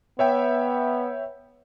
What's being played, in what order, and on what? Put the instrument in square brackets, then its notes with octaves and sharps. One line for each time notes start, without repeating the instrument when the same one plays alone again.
[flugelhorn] B3 [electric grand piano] C#5 E5 G5